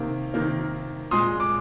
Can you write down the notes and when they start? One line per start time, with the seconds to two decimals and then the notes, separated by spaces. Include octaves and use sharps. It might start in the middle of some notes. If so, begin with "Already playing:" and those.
Already playing: C3 D#3 A#3
0.34 C3 D#3 A#3
1.11 A#2 G#3 C6 D#6
1.40 D6